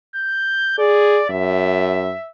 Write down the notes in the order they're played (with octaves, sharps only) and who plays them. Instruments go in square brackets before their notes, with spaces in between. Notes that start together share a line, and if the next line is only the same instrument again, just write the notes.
[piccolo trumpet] G6
[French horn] G#4 [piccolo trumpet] D5
[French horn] F#2 [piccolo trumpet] E5